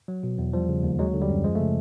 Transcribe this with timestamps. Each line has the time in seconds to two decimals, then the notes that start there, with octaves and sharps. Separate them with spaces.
0.08 F#3
0.23 B2
0.38 E2
0.53 F3 G3
0.69 C#3
0.83 D#2
0.99 F#3 G#3
1.14 D3
1.22 G3
1.30 F#2
1.44 F3 G#3
1.55 C#3 A3